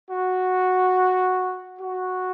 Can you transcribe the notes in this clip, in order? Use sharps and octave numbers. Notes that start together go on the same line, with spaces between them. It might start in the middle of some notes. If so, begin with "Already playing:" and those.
F#4
F#4